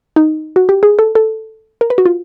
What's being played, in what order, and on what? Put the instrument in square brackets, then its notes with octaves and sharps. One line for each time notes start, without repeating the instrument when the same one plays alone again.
[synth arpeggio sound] D#4
F#4
G4
G#4
A4
A4
A#4
B4
F#4
F4